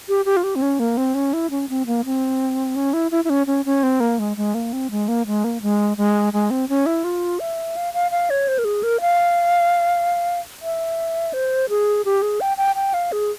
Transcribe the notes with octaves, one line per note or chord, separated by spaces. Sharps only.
G4
G4
F4
G4
C4
C#4
A#3
C4
C#4
E4
C#4
C4
A#3
C4
C#4
E4
E4
E4
C#4
C#4
C#4
C4
A#3
G#3
G#3
A#3
C4
G#3
A#3
G#3
A#3
G#3
G#3
G#3
C4
C#4
E4
F4
E5
F5
F5
F5
C#5
C5
A#4
G#4
A#4
F5
E5
C5
G#4
G4
G#4
G5
G5
G5
F5
G#4